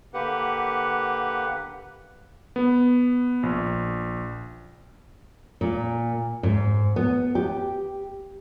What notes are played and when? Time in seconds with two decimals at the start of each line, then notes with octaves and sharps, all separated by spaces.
0.14 D3 A#3 G4 B4 F#5
2.56 B3
3.43 A#1
5.61 A#2
6.43 G#2
6.96 B3
7.35 G4